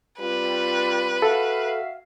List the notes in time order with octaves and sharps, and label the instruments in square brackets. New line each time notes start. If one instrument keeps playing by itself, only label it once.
[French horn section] G3 C4 F4 [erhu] B4
[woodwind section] F#4 E5 F5 [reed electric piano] A4